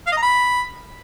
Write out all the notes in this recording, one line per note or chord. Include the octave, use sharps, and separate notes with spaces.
F5
D#5
A#5
B5